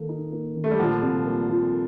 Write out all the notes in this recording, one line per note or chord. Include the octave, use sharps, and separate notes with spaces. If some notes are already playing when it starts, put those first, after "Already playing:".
Already playing: D#3 A#3 A4
D#4
A#3
D#3
A3
G3
A#2 D3 F3
C2
A#3
F3